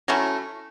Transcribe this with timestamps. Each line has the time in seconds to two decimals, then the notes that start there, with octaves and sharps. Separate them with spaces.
0.08 F#3 A3 C#4 E4